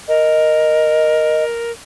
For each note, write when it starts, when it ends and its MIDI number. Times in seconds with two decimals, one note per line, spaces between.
0.08 1.71 70
0.08 1.44 75